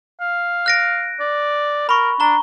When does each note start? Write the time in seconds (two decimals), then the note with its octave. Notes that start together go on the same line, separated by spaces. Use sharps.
0.21 F5
0.66 F#6 A#6 D7
1.20 D5
1.89 A#4 B5 C#6
2.20 D4 A#5 G7